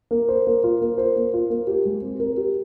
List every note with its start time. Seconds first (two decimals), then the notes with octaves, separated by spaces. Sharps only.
0.11 A#3
0.29 C5
0.47 A#3
0.64 F4
0.81 A#3
0.98 C5
1.16 A#3
1.34 F4
1.50 A#3
1.67 G4
1.85 G#3
2.02 C4
2.20 A#4
2.37 G4